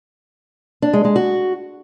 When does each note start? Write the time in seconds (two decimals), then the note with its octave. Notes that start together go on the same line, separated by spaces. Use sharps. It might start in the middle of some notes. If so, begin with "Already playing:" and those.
0.82 D4
0.93 G#3
1.05 G#3
1.16 F#4